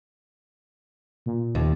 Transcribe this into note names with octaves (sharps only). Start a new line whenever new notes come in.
A#2
D#2